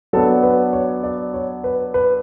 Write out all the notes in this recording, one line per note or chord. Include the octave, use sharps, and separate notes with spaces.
F#3 B3 D4 A4
B4
C#5
D5
C#5
B4
B4